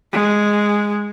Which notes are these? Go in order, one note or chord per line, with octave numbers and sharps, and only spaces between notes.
G#3